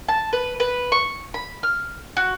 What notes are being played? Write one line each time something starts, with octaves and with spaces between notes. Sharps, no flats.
A5
B4
B4
C#6
B5
F6
F#4